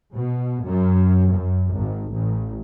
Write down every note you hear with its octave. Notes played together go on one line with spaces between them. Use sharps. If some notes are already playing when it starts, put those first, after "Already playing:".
B2
F#2
F#2
G#1
A1